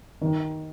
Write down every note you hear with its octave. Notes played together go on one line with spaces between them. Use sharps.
D#3